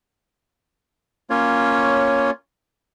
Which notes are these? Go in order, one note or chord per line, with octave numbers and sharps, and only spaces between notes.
A#3 C#4 F4 C#5